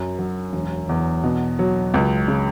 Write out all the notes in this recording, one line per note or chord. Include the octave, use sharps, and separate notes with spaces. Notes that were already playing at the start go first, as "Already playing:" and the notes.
Already playing: F#2
F#3
E1
E2
B2
F#3
C#2
C#3